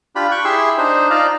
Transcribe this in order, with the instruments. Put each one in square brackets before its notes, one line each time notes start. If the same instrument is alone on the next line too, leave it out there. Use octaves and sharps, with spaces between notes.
[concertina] D4 F4 G4 B5
G5 C#6 F#6
E4 G4 G#4 E5 C6 E6
D4 D#4 C5
D#4 F4 D5 F5 A#5